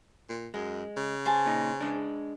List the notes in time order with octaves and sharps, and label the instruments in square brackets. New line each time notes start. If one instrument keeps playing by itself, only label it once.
[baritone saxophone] A#2
[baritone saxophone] F#2 [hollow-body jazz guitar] G#3
[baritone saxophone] C#3
[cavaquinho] C5 G#5 A5
[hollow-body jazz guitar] A#2 D#4
G#3 D4